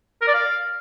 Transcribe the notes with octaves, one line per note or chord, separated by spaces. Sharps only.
A#4
D5
F5